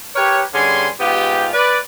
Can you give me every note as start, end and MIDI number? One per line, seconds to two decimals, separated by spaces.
0.16 0.42 67
0.16 0.42 70
0.16 0.42 71
0.16 0.42 73
0.54 0.87 43
0.54 0.87 50
0.54 0.87 61
0.54 0.87 68
0.54 0.87 80
0.54 0.87 84
1.00 1.48 44
1.00 1.48 59
1.00 1.48 65
1.00 1.48 67
1.53 1.77 71
1.53 1.77 74